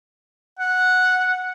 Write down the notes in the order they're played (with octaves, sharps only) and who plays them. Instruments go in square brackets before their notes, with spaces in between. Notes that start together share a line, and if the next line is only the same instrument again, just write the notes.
[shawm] F#5